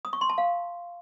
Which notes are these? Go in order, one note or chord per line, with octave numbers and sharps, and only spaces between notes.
D#6
C#6
C6
A5
F5